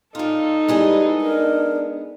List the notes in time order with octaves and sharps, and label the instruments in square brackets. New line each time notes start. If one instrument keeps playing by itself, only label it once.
[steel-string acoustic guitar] A#2 F4 [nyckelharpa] D#4 A4
[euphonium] G3 [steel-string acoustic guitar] G#3 B3 G#4 [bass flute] E4
[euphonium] D4 [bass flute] A#4